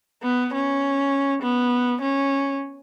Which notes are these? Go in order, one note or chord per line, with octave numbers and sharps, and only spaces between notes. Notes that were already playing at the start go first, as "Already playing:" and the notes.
B3
C#4
B3
C#4